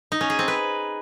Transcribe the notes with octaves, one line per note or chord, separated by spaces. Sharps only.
D#4
C#4
G#4
C4
B4